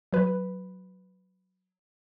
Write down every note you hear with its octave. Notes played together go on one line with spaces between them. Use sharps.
F#3 B4